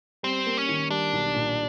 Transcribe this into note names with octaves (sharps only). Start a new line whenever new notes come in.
G3 C4
A#3
C#4
D#3
G3 D4
B1
A#2